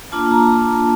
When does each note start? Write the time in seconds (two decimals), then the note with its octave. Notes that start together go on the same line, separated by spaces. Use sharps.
0.12 A#3 D4 F4 A5
0.31 A#5